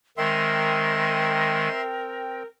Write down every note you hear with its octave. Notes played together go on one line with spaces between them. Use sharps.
D#3 G#3 C4 A#4 E5 G5 C6